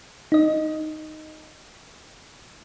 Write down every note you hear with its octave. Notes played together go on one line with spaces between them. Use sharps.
D#4 D#5